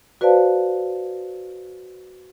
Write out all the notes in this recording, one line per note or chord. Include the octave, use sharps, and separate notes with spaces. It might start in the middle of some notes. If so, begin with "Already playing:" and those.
F#4 B4 C5 D5 F5 A5